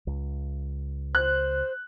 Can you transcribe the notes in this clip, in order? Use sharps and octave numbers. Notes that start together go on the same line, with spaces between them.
C#2
C5 F#6